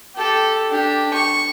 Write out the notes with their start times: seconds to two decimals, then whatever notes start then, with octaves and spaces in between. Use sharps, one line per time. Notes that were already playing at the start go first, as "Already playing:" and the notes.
0.15 G4 A4
0.70 D4 G4
1.13 C#6